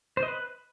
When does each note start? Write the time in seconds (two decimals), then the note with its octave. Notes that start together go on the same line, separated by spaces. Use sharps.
0.17 C5
0.23 D#5
0.28 B4